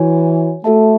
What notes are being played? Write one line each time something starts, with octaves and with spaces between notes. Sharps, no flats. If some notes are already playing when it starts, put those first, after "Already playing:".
Already playing: E3 F#4 C#5 G#5
A3 F#4 A4 E5 A5